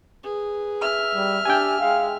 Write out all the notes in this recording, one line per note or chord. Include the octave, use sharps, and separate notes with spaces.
G#4 B4
E5 F6
G3
D4 G4 G5 G#5
G#3 F5